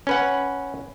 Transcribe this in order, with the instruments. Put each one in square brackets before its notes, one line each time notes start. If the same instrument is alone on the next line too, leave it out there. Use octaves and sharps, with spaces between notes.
[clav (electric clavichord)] C#4 B4 F#5